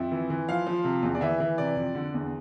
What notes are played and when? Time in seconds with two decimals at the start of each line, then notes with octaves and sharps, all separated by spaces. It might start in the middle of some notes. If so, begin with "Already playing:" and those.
Already playing: F2 E5
0.12 E3
0.30 E3
0.49 F3 F5
0.67 F3
0.84 C3
1.02 E2
1.15 D5
1.21 E3 E5
1.40 E3
1.58 C3 D5
1.76 F2
1.95 D3
2.14 E2